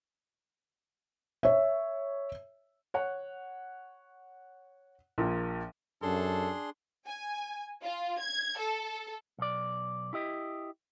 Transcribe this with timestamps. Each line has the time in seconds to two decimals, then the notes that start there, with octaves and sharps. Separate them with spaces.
1.43 C#5 E5
2.94 C#5 F#5
5.18 A#1 A#2
6.02 F#2 D4 G#4 A4 C6
7.06 G#5
7.83 F4
8.21 G#6
8.60 A4
9.39 B1 D5
10.13 E4 G4 D#5